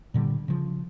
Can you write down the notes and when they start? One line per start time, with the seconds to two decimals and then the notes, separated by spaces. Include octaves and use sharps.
0.14 A#2 D3 F#3 G3
0.48 C#3 F3